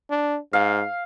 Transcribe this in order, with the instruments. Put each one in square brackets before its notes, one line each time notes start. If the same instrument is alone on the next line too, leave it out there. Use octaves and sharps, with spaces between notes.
[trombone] D4
[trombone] G#2 [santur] F5